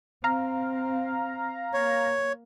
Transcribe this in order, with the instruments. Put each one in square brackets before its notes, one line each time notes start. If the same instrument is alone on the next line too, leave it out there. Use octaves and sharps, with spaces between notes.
[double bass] C4 [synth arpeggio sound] F5 A#5
[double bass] A#3 [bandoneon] C#5